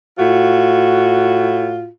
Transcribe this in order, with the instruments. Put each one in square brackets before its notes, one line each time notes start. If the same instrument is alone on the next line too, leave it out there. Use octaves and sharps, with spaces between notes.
[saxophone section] A2 F4 F#4